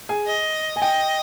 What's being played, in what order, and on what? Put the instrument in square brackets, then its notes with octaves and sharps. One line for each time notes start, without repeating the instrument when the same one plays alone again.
[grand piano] G#4 G#5
[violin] D#5
[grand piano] G#5
[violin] D#5 [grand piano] G5